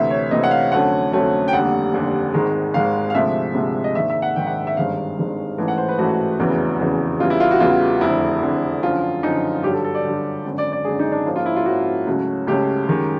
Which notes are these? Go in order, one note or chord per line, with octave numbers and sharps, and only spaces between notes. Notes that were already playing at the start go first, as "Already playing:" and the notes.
Already playing: D2 C3 E3 E5
C#5
D2 C3 E3 D#5
F#5
F5
F2 D3 F#3 A3 C#4 F#5
F2 D3 F#3 A3 C#4
G5
F1 D#2 D3 G3 F#5
F1 D#2 D3 G3
G#1 G#2 D#3 G#3
G#1 G#2 D#3 G#3 F5
F5
D2 C3 F3 G#3 E5
D2 C3 F3 G#3
D#5
A#1 G#2 D#3 E5
E5
F#5
A#1 G#2 D#3 G5
F#5
E5
G1 G2 D#3 G#3 C4 F5
G1 G2 D#3 G#3 C4
A1 G#2 E3 A3
F#5
C5
B4
A1 G#2 E3 A3 F#4
F1 E2 C#3 E3
F1 E2 C#3 E3
E2 C#3 E3 G3 F4
E4
F4
F#4
E2 C#3 E3 G3 F4
F1 F2 D3 E4
F1 F2 D3
F#2 D3 F3 F4
F#2 D3 F3 D#4
G2 D3 F#3 G4
A4
A4
D5
G2 D3 F#3
G#1 F#2 D3
D5
D5
G#1 F#2 D3 G#4
D#4
D4
G#2 F3 A#3 C#4
F4
E4
F4
G#2 F3 A#3 C#4 F#4
C#2 C#3 F#3 A3 C#4
C#2 C#3 F#3 A3 C#4 G4
F#2 D#3 G#3